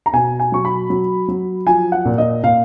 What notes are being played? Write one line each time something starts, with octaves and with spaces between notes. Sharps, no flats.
A#5
B2 G#5
G#5
F#3 C#6
B5
F#3
F#3
F3 G#5
F#5
A#2
D#5
A#2 F5